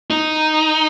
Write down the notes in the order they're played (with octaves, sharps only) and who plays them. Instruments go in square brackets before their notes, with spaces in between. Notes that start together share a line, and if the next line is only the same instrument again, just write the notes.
[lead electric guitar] D#4